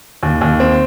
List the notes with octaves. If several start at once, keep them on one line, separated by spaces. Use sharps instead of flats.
D#2
D#2
C4